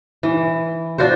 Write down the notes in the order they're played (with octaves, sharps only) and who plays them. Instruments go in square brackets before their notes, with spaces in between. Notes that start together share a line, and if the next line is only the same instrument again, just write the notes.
[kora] E3
D4 F4 F#4 C5